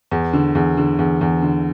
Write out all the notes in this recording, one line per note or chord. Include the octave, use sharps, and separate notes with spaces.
E2
D3
E2
D3
E2
E2
D3